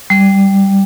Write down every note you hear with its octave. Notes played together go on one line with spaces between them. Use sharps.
G3